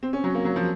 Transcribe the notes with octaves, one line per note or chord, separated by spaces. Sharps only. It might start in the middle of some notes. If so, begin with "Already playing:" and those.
C4
C#4
F#3
A#3
F#3
F3